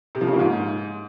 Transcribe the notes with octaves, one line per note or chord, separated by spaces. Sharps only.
C3
F3
C#3
A#3
G#2